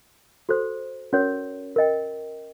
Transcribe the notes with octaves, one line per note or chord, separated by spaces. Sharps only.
F#4 A4 C5
C#4 F#4 A#4 C#5
A#4 D#5 G5